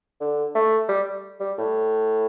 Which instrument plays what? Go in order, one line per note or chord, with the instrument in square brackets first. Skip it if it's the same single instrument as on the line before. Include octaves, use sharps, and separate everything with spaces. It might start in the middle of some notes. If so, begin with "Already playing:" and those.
[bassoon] D3
A3
G3
G3
A2